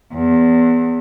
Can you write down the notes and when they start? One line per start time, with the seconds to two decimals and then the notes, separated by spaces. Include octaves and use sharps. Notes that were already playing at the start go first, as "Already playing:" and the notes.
0.15 E2